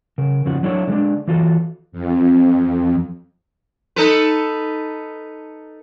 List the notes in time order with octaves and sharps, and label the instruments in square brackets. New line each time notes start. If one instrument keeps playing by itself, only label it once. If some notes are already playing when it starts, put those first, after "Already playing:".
[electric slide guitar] C#3 A#4
F2 C#3 F3 F#4
F#3 D4 E4 A4 B4 C#5
D3 G#3 D4
E3 F4 F#4 A4
[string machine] F2
[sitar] D#4 A4 B4